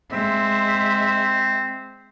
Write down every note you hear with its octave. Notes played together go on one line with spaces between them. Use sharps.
G#3 C4 E5